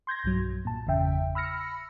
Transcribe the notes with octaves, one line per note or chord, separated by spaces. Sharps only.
C6 G6 G#6 A#6
B1 G2 F#3
A#2 A5
G1 E2 C#3 E5 G5
B5 E6 F6 A#6 C#7